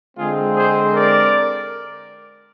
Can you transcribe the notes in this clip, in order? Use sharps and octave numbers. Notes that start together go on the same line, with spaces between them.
D3 G#3 C4 F4 G#4
G#4 C5
A#4 D5